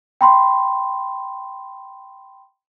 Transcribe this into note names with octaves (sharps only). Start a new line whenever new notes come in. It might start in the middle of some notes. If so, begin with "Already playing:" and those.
G5 B5 C6